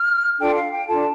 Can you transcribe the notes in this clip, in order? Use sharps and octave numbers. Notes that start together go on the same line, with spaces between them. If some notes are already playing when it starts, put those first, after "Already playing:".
Already playing: F6
D4 F4 A4 G5
F5
G5
D4 F4 A4 A5